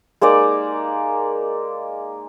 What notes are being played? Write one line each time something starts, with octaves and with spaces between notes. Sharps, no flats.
G#3 A#3 D#4 D5